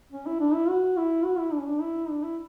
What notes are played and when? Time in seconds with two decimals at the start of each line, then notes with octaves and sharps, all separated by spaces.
0.12 C#4
0.26 E4
0.40 D4
0.54 E4
0.69 F#4
0.97 E4
1.24 F#4
1.39 E4
1.53 D4
1.61 C#4
1.68 D4
1.82 E4
2.10 D4
2.23 E4